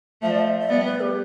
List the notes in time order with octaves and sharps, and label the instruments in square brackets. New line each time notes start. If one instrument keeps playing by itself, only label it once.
[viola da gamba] F3 A3 [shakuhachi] E5
[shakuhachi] D5
E5
E5
[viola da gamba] G3 B3 [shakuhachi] D5
[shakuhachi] B4
G4